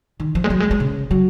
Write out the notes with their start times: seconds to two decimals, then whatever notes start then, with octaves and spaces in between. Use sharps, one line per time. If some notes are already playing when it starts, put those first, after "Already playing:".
0.20 D#3
0.35 F3
0.44 G#3
0.50 F#3
0.60 G#3
0.71 G#3
0.80 C#3
1.11 F#3